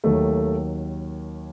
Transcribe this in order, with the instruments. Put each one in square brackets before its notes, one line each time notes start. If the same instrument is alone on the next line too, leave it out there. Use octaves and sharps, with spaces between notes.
[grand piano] D#2 D#3 F#3 A3